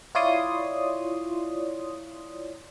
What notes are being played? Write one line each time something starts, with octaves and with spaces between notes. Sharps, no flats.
E4 F4 C#5 D5 C6 D#6